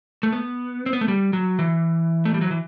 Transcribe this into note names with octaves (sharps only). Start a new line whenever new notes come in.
A3
B3
C4
B3
A3
G3
F#3
E3
A3
G3
F#3
E3